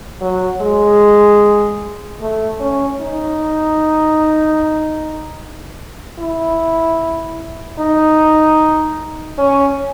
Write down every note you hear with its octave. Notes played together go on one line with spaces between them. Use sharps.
F#3
G#3
A3
C#4
D#4
E4
D#4
C#4